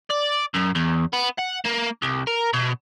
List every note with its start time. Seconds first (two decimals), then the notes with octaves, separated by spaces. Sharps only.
0.10 D5
0.54 F#2
0.75 E2
1.13 B3
1.38 F#5
1.65 A#3
2.02 C2
2.27 A#4
2.54 B2